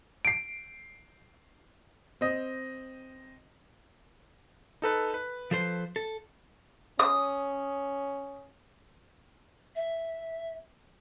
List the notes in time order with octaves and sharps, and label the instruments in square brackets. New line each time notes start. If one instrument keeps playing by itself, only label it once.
[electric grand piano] C7 D7
[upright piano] C4 D#5
[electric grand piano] D#4 A4 B4
B4
[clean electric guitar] F3 A4 C5
A4
[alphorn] C#4 [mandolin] D#6
[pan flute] E5